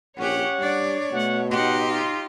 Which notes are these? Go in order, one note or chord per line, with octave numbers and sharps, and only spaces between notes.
A#1 C#4 G4 C#5 F#5
G3 D4 D5
B2 A3 F#5
D#4 G4 F#5 C6
F4